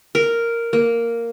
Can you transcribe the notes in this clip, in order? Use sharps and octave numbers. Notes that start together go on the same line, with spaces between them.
A#4
A#3